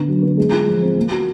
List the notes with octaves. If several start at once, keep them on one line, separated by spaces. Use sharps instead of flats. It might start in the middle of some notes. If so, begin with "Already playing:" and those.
Already playing: D3 B3
F#3
B3
G#3
F4
F3
C4
A#3
F#4